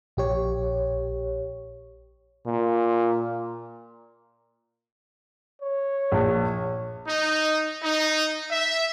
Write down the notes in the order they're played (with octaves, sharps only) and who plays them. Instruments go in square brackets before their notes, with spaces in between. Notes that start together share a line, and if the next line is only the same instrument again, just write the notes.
[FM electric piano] A#1 G4 C#5
[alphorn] A#2
[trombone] C#5
[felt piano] A#1
[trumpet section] D#4
D#4
E5